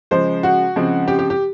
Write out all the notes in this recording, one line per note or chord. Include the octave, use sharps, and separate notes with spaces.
C#3 F3 G#3 C5
F#4
C#3 F3 G#3 C4
G4
G4
G4